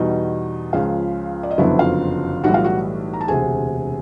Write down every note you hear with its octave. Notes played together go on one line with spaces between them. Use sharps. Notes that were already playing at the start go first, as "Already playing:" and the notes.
Already playing: E2 B2 G3 D#4 D#5
C#2 C#3 F3 F4 F5
D5
D#5
F#1 F2 D3 F#3 B3 E4 E5
F4 F5
B1 A2 E3 G3 F#4 F#5
F4 F5
F#4 F#5
A#5
A5
E1 D2 C3 G#4 G#5